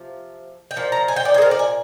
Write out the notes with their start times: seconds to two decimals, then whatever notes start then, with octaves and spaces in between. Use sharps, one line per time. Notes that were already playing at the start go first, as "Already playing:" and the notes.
Already playing: C3 F3
0.71 G5
0.76 A#2 F3
0.92 A#5
1.08 G#5
1.16 G5
1.25 D5
1.34 C5
1.38 G#4
1.42 A#4
1.51 D5
1.59 G#5